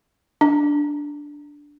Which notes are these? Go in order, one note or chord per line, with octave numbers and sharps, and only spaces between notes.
D4